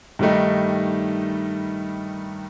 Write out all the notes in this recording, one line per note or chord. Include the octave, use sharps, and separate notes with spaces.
G2 D#3 G3 A3 D#4